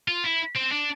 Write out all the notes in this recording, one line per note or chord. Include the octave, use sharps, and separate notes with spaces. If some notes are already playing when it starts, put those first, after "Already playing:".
F4
E4
C4
D4